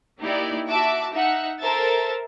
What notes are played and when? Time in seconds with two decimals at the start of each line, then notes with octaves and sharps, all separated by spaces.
0.21 A#3 D#4 E4 G4 D5
0.67 F#4 E5 A5 D6
1.13 D#4 E5 F#5
1.60 A4 A#4 C5 E5 A6